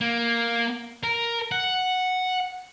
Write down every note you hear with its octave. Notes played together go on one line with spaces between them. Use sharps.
A#3
A#4
F#5